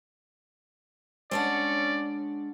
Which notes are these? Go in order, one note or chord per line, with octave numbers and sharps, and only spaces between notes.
G#3 C#4 D4 D5 F#5